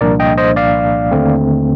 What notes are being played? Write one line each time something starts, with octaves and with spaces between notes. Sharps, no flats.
C2 A#2 F3 A#3 D4 A#4 D5
D#5 G5
C5 D#5
D5 F5
D#2 D3 A3 C4